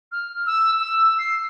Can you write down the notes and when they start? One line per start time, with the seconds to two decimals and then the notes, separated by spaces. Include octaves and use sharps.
0.12 F6
0.46 E6
0.80 E6
1.19 C7